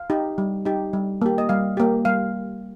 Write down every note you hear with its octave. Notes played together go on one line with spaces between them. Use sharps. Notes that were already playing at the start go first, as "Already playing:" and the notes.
Already playing: F5
D#4 G4
G3
D#4 G4
G3
A#3 G4
D#5
G3 F5
A#3 G4
G3 F5